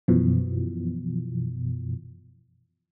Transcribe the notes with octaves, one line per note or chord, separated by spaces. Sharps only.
F#2 B2 E3 F3